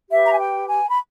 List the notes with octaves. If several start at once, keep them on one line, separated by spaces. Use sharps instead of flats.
G4 B4 E5
A#5
G#5
G5
G#5
B5